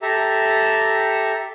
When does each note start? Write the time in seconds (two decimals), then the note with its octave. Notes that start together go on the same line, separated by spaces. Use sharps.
0.02 G4 A4 E5 A#5